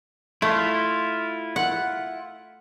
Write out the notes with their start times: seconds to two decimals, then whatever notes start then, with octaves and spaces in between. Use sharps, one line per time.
0.42 A3 E4 F4
1.56 F#5